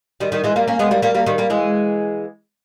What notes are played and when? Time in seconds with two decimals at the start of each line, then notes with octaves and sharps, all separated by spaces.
0.20 D#3 G3
0.32 D#3 G3
0.44 E3 G#3
0.56 G3 A#3
0.67 A#3 C#4
0.79 G#3 B3
0.91 G3 A#3
1.02 G3 A#3
1.15 G3 A#3
1.26 D#3 G3
1.38 G3 A#3
1.50 E3 G#3